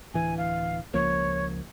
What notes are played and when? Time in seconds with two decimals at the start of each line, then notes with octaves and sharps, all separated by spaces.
0.14 D1 E3 G#5
0.38 F5
0.94 C#2 F3 A#3 C#5